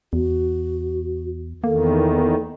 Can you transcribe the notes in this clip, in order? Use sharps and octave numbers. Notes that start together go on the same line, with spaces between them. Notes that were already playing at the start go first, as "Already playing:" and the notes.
E2 F#4
E2 D#3 A#3 A4